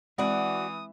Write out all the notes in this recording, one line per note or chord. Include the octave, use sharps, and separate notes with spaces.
E3 G#3 C4 F#4 D5 B5 D#6